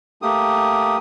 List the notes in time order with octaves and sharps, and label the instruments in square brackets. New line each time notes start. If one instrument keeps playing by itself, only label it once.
[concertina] A3 A#3 G4 D#6